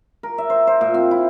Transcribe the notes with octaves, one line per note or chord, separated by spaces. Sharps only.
A#4
E5
C5
C5
A#2
C4
E4